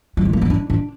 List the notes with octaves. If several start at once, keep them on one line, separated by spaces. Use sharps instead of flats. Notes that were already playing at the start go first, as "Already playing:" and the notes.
F#3
G#3
A#3
B3
D4
D4